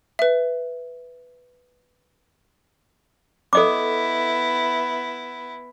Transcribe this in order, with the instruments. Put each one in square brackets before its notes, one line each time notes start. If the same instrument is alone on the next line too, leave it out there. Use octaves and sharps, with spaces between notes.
[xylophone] B4 E5
[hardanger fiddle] B3 E4 [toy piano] A4 D#5 D6